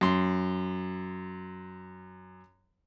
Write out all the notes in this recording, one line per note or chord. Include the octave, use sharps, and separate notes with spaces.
F#2 C6